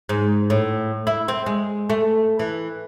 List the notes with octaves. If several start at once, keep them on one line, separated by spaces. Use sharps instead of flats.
G#2
A2
E4
C4
G#3
A3
E3